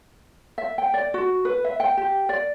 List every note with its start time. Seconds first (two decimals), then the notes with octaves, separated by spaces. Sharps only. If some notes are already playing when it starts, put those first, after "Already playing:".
0.58 E5
0.78 G5
0.94 D5
1.14 F#4
1.45 B4
1.64 E5
1.80 G5
1.97 G4
2.29 D5